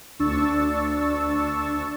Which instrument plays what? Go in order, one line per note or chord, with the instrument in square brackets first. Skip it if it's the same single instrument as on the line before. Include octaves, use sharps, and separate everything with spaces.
[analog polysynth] D2 D4 C#6 E6 A6